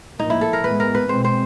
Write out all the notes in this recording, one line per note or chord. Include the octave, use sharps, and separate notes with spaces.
A2 F3 A#3 D#4
E4
A4
A#4
A2 E3 G#3 B3 B4
A#4
B4
B2 G#3 C4 C5
C5